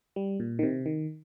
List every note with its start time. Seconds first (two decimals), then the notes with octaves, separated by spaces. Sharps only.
0.16 G3
0.40 A#2
0.59 D#3
0.63 C3
0.86 D#3